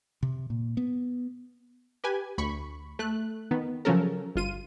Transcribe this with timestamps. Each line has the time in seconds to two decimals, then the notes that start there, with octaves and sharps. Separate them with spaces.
0.23 C3
0.50 A#2
0.77 B3
2.04 G4 B4 G#5
2.38 D2 B5 C#6
2.99 A3 F#6
3.51 D#3 B3
3.85 C#3 F3 F#3 C#4 A4 A#4
4.35 G1 F4 D#7